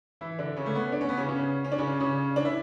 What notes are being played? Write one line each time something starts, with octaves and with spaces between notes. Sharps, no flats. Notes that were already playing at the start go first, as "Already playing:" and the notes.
E3 E4
D3 D4
C#3 C#4
A3
B3
D4
C#4
B3
C#3 C#4
C#3 C#4
C#4
D4
C#3 C#4
C#3 C#4
D4
E4